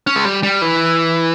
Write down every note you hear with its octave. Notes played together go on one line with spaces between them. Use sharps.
C#4
G#3
G3
G3
E3